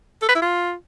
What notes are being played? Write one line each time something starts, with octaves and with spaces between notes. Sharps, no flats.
A4
B4
E4
F4